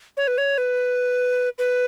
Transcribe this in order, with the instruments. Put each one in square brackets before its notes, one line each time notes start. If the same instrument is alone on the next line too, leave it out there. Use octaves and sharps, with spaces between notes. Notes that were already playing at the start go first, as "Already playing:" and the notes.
[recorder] C#5
B4
C#5
B4
B4